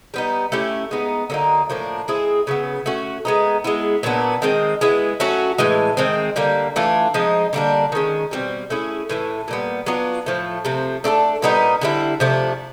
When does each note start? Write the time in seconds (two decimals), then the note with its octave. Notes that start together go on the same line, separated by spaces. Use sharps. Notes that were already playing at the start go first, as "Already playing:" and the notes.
0.14 G3 B3 D#4
0.52 A3 C#4 E4 G4
0.91 G#3 B3 D#4
1.30 D3 F#3 A#3 D#4
1.70 A2 F3 A#3 D4
2.08 G#3 C4 E4 G#4
2.47 C#3 F#3 B3
2.86 A3 C#4 F#4
3.25 G#3 B3 D#4
3.64 G#3 B3 E4
4.03 A#2 F#3 B3 D4
4.42 D#3 G#3 C4
4.81 G#3 B3 E4
5.20 F#3 A3 C#4 F#4
5.58 A2 E3 G#3
5.97 D#3 G#3 C4
6.36 D3 G3 A#3
6.76 E3 A3 D4 F4
7.14 F3 G#3 C4 D#4
7.53 D3 G3 A#3 D4
7.92 D#3 G#3 C#4
8.31 B2 G3 C4
8.70 A3 C#4 E4 G#4
9.09 A2 E3 A3
9.48 A#2 G3 B3
9.86 F#3 B3 D4 F4
10.26 A2 F3 A3
10.65 C3 F3 A3 C4
11.04 A3 D4 F#4 A4
11.42 A#2 G3 B3 D#4
11.81 D3 G3 C4 E4
12.20 C3 F3 A3 D4